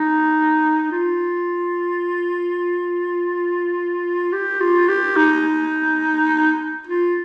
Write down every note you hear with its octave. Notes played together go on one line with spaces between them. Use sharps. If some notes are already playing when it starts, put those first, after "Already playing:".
Already playing: D#4
F4
G4
F4
G4
D#4
F4